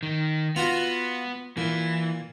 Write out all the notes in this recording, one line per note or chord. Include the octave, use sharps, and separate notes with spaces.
D#3
B3 F4 F#4
A#2 E3